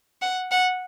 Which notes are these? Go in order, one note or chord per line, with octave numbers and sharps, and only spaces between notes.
F#5
F#5